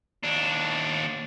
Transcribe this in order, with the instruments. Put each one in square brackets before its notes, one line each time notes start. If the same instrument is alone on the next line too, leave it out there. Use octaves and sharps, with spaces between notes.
[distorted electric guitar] D#2 D4